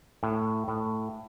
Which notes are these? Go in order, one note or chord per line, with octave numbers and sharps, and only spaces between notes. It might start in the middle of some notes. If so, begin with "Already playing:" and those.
A2
A2